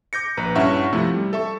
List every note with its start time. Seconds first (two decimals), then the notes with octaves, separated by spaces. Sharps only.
0.13 D6 G6 A#6 C#7
0.37 A#1 B4 A#5
0.55 G2 C#4 E4 E5 F#5 C#6
0.93 C3 F3 A3 E4 A4
1.14 G3
1.33 A4 E5 C#6